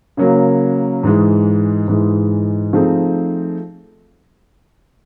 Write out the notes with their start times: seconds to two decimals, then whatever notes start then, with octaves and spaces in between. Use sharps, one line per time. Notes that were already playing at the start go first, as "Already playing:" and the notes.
0.17 C#3 F#3 A#3
1.03 G#2 E3 G#3
1.88 G#2 E3 G#3
2.73 F3 A3 C4 D#4 G#4